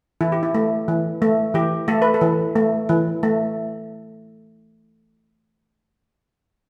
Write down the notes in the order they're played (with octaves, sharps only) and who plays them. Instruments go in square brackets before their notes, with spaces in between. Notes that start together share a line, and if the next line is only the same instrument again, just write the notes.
[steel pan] E3 E4
G4
E4
A3
E3
A3
E3 G4
A3 A4
B4
A4
E3
A3
E3
A3